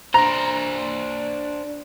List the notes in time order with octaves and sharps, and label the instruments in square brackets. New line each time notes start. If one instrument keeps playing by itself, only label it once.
[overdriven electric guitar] D4 C5 [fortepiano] A#5